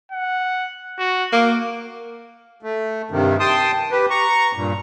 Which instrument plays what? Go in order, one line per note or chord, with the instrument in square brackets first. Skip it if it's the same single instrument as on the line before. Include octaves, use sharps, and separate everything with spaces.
[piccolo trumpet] F#5
F#4
[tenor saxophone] A#3 [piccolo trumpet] D6
[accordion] A3
G2 C3 D#3
G5 A5 C6 D#6
G4 B4
A#5 C#6
G2 A#2